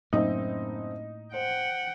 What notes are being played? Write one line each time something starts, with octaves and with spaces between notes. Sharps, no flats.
F#1 A2 A#3 C4 D#4 E5
C5 F#5 G5